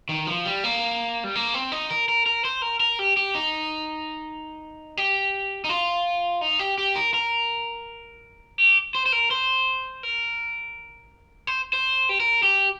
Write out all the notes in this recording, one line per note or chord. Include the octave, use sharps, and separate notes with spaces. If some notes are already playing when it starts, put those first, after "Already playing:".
D#3
F3
G3
A#3
G3
A#3
C4
D#4
A#4
A#4
A#4
C5
A#4
A#4
G4
G4
D#4
G4
D#4
F4
D#4
G4
G4
A#4
A#4
G4
C5
C5
A#4
C5
A#4
C5
C5
G4
A#4
G4